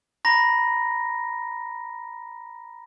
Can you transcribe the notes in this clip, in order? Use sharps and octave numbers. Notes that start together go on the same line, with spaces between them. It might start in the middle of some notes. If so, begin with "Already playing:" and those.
A#5 B5 A#6